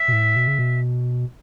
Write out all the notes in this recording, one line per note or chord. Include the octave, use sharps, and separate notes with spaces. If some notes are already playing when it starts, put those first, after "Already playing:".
Already playing: E5
B2
A2
B2
C#3
B2